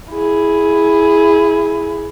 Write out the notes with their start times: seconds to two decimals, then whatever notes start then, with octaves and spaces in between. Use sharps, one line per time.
0.14 E4 G#4